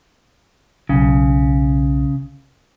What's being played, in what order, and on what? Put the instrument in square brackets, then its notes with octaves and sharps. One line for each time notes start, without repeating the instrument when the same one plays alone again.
[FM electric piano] B1 [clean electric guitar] C#3